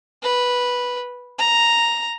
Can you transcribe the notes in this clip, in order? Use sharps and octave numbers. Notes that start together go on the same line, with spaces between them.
B4
A#5